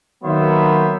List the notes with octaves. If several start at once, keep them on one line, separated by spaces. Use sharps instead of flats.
D#3 F#3 A#3 B3 C5 E5